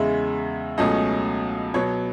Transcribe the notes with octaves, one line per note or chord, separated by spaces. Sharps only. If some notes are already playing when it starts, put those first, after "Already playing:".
Already playing: E2 C#3 G#3 E5
C#2 B2 F#3 A3 C#4 D#5
B2 F#3 B3 C#5